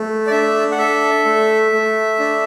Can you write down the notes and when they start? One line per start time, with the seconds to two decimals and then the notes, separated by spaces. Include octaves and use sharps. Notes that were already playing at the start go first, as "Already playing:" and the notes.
Already playing: A3
0.27 D5
0.31 D4 E5
0.72 F#5
0.78 A4 E5
1.25 A3
1.72 A3
2.19 D4